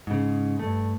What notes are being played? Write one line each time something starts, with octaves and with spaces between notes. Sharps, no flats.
G#2 C#3
G2 A3